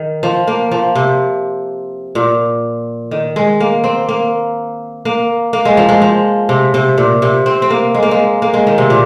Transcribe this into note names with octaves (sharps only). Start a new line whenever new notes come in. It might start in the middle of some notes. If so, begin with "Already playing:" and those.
Already playing: D#3
F3
A#3
F3
C3
A#2
D#3
G#3
A#3
C4
A#3
A#3
A#3
G#3
F3
G#3
F3
C3
C3
A#2
C3
C4
C4
A#3
G#3
A#3
G#3
A#3
G#3
D#3
C3
A#2